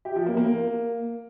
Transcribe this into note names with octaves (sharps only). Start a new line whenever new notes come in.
G4
F3
A#3
A#3